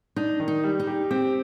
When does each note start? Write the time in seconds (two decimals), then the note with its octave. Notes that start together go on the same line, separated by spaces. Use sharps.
0.16 D4 D#4
0.40 D#3
0.48 D#4
0.63 G3
0.80 D#4
0.87 G4
1.11 C4 G4